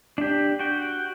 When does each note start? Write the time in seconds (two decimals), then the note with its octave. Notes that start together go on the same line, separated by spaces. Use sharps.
0.18 D4 G4
0.59 F#4 G5